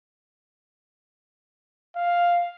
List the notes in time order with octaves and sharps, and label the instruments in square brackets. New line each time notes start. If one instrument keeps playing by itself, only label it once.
[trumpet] F5